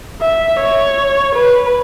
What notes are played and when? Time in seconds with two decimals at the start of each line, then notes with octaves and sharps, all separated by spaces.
0.22 E5
0.60 C#5
1.36 B4